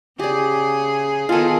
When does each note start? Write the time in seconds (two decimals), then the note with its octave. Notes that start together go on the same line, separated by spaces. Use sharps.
0.20 C#3 G4 G#4 D5
1.29 D#3 B3 F4 G#4 A4